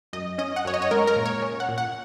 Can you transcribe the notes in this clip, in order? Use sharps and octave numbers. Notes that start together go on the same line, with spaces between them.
F#2 D#5
C#4 D#5
F#5
F#2 C#5
D#5
C#5
G#3 A#4
A#4
A#2
C#5
C#4
F#5
A#2
F#5